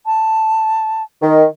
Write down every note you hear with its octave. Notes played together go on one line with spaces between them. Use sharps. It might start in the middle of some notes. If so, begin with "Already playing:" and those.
A5
D#3